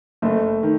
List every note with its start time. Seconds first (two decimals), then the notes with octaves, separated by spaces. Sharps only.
0.22 F#1 A3
0.63 D#3